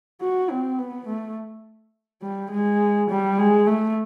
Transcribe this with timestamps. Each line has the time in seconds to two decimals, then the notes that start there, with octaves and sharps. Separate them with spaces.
0.21 F#4
0.50 C4
0.78 B3
1.08 A3
2.23 G3
2.51 G#3
3.10 G3
3.39 G#3
3.67 A3